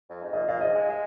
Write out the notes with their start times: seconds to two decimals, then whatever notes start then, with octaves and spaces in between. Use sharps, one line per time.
0.10 F2
0.22 G#2
0.33 A#2 D#5
0.48 A#2 F5
0.61 G#2 D#5
0.75 G#3
0.90 G#3